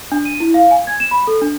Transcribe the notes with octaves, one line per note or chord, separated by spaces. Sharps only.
D4
D#7
E4
F5
G#5
G#6
E7
B5
A4
D4